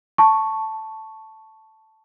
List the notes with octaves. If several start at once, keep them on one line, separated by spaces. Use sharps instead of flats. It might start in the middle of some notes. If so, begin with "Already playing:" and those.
A5 C#6